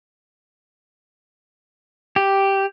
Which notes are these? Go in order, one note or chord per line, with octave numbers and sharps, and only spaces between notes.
G4